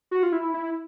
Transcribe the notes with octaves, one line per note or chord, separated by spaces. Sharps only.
F#4
F4
E4
E4